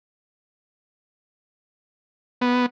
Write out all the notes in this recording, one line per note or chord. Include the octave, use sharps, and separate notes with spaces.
B3